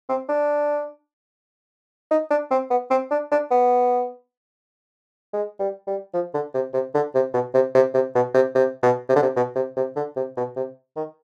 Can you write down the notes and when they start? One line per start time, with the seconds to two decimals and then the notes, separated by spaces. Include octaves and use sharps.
0.09 C4
0.29 D4
2.11 D#4
2.30 D4
2.51 C4
2.71 B3
2.91 C4
3.11 D4
3.32 D4
3.51 B3
5.34 G#3
5.59 G3
5.87 G3
6.14 F3
6.34 D3
6.54 C3
6.74 C3
6.95 D3
7.15 C3
7.34 B2
7.54 C3
7.75 C3
7.94 C3
8.15 B2
8.35 C3
8.55 C3
8.83 B2
9.09 C3
9.16 D3
9.23 C3
9.36 B2
9.55 C3
9.77 C3
9.96 D3
10.16 C3
10.37 B2
10.56 C3
10.97 D#3